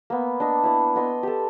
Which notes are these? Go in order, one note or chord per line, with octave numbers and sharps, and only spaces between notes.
A#3 B3
D4 D#5
E4 D5
B3 D#5 C6
G4 A4